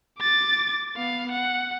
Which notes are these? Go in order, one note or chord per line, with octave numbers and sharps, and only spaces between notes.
D6 A6
B3 F5
F#5